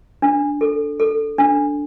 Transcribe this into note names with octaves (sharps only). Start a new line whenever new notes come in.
D4
A4
A4
D4